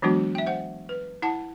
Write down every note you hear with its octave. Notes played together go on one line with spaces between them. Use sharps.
E3 F#3 G#3 B3 D4 F#4
E5 G5
C5 F#5
B4
E4 F#5 A5